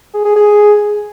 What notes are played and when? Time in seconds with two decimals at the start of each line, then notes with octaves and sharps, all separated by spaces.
0.14 G#4
0.25 G#4
0.36 G#4